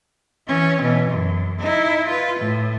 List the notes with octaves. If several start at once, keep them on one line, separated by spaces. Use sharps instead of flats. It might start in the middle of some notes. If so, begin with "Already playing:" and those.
E3 C#4
B2 E3
F#2
D#4 E4
F4 B4
A2